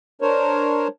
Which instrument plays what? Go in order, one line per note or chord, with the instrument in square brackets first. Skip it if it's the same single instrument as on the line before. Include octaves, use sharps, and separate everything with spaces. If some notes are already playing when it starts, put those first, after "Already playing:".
[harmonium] D4 A#4 C5 C#5